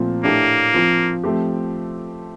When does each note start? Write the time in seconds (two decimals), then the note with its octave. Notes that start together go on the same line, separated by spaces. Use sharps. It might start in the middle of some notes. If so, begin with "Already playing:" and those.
Already playing: A#2 F3 A3 C4 F4
0.24 A2 A3 A#3 D4 G4
0.74 F3 C4 F4
1.24 F3 A3 C4 G4